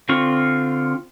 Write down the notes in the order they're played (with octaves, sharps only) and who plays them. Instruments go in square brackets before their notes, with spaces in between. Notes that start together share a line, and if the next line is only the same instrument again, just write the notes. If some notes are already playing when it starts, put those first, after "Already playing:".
[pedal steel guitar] D3 C4 F4 C#6